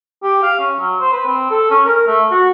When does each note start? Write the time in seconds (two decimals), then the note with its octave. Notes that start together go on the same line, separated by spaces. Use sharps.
0.23 G4
0.43 F5
0.59 C#4
0.80 F#3
1.00 C5
1.13 B4
1.26 C4
1.50 A4
1.71 C#4
1.86 A#4
2.07 A3
2.31 F#4